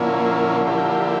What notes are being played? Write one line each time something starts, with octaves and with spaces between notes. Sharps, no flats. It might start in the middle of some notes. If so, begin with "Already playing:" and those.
Already playing: A#2 D3 F3 A#3 C#4 E4
F3 A#3 E4 G4